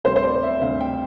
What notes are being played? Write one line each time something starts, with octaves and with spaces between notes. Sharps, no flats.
D2 C3 G3 C5
C5
D5
E5
D2 C3 G3 F5
G5